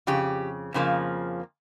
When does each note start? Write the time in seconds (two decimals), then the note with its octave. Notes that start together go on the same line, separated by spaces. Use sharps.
0.07 F2 C#3 G4
0.74 F2 C#3 F3 A#3